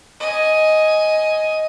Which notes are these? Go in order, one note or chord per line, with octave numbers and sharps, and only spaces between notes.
D#5 G#5